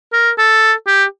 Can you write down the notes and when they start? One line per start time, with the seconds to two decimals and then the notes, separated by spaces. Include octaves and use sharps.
0.13 A#4
0.38 A4
0.87 G4